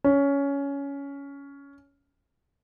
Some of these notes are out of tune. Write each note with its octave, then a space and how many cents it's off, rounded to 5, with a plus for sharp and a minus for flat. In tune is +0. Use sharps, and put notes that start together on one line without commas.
C#4 +15